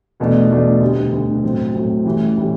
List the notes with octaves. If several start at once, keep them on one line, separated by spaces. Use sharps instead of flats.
E2 B2 A3 D4
E2 B2 A3 D4
D2 C3 G3
D2 C3 G3
A2 F#3 C4
A2 F#3 C4
A1 A2 E3 G3
A2 E3 G3